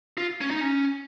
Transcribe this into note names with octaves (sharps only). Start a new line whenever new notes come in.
F4
C#4
D#4
C#4